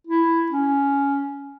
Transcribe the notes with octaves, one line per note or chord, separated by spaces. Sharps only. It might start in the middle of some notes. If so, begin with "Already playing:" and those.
E4
C#4